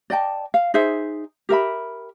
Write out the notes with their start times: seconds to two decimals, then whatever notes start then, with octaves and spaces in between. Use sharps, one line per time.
0.10 D5 D#5 G5 A5
0.54 F5
0.74 D#4 G#4 C5 E5
1.49 G4 A#4 E5 B5